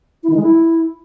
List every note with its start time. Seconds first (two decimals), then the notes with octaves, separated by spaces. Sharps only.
0.23 E4
0.30 D#3
0.36 G#3
0.43 E4